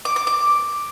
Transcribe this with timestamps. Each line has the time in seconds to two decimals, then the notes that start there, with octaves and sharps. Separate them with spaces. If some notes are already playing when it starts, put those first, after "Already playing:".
0.05 D6
0.16 D6
0.27 D6